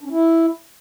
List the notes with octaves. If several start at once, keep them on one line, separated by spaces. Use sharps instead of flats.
D4
C#4
E4